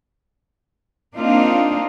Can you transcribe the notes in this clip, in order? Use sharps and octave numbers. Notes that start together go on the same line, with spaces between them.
A#3 C4 D4 D#4 F4